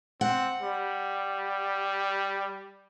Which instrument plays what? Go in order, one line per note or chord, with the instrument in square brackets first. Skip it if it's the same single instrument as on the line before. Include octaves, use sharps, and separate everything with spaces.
[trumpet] C4 [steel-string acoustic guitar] F#5
[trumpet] G3